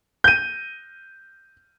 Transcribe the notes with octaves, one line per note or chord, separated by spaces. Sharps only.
G6 D#7